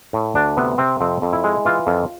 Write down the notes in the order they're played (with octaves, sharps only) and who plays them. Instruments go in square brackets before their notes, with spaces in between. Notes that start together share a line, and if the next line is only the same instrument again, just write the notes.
[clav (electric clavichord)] A2
D2 D4
C3 B3
C3 C4
F2 C4
F2
E4
G#3
E3 F4
F2